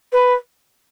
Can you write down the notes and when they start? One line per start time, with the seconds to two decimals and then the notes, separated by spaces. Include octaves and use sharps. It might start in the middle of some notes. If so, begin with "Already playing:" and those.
0.12 B4